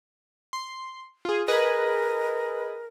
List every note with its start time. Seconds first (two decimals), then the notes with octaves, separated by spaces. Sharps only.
0.53 C6
1.25 F4 G#4
1.48 G#4 A#4 B4 D#5